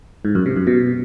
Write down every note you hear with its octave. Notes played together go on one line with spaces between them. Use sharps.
G#2
F#2
C3
F#2
B2